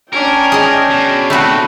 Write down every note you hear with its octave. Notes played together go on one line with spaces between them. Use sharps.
C#4 D4 A#4 G5
G#4 D#5
B2
B2 A3 C4 F#4 B5